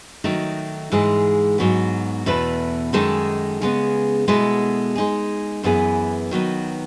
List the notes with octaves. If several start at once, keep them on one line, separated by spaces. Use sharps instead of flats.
D#3 F#3 A3 D#4
G#2 E3 G#3
G#2 F#3 B3
E2 B2 A3 E4 B4
F#2 D#3 G#3 D#4 A4
C#3 G#3 B3
B2 G#3 B3 E4 A4
G#3 D#4 G#4
F#2 E3 B3 E4 G#4
D#3 F#3 B3 D#4